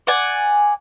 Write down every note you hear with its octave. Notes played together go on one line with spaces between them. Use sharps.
D5 F#5 G#5